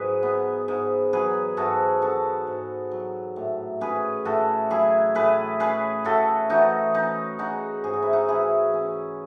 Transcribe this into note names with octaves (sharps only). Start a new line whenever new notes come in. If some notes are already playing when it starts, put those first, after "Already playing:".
Already playing: G#2 F#3 G#4 B4
B3
G#2
F#3 G#4 B4
G#2 F#4 A4
B3 F#4 A4
G#2
F#3
A2
C#4 G#4 B4
A2 F#4 A4
F#3 E4 G#4
A2 G#4 B4
C#4 G#4 B4
A2 F#4 A4
E3 D#4 F#4
C#4 D#4
G#3 D#4 F#4
G#2 G#4
F#4
E4
D#4 F#4
E3 E4 G#4
C#4